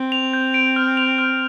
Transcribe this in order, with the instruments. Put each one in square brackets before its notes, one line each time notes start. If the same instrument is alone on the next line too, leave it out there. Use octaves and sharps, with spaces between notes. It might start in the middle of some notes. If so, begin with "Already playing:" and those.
Already playing: [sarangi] C4
[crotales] F7
G6
D7
F6
F7
F6